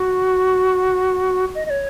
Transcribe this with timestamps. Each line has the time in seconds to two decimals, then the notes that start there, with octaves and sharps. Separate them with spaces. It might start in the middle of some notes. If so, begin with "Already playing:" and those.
Already playing: F#4
1.55 D#5
1.66 D#5
1.70 C#5